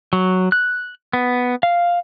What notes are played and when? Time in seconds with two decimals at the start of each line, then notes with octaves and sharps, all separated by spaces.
0.13 F#3
0.52 F#6
1.13 B3
1.63 F5